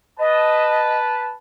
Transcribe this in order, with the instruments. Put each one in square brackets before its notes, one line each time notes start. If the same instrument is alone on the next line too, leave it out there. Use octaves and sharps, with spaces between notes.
[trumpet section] B4 A5 [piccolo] D#5